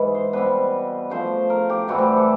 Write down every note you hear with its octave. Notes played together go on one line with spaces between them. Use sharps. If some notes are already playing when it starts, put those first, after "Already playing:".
Already playing: G#2 E3 G#3
C5
B2 G3 C4 B4
C#3 F3 A3 C5
A#4
G4
A2 E3 G3 C4 F#4
G4
A4